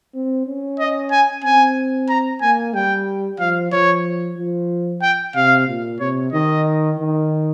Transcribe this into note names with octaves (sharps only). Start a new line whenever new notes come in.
C4
C#4
D#5
G#5
C4 G#5
A#5
A#3 G#5
G3 G5
F3 F5
F3 C#5
F3
G5
C3 F5
A#2
C3 C#5
D#3 D#5
D#3